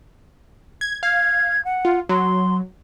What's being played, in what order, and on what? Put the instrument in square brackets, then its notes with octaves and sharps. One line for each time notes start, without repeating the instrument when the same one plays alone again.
[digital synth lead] G#6
[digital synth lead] F5 [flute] G#6
[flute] F#5
[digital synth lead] F4
[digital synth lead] F#3 [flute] C6